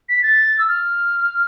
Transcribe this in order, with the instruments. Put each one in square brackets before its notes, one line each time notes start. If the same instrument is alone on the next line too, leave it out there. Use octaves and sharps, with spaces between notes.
[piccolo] B6
A6
E6
F6